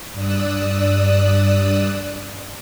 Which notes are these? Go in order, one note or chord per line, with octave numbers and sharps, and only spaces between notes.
G2 D5 D#6 E6 F#6